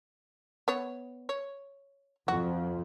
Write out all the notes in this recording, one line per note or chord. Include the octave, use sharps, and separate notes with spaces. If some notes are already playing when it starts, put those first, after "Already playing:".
B3 C#5
C#5
F2 F3 F#4